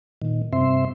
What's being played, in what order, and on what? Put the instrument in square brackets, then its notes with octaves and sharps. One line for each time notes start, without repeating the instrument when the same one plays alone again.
[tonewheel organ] A#2 D#3
G2 C3 C4 E5 C6